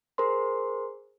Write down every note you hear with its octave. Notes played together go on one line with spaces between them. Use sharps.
G#4 A#4 C5 C6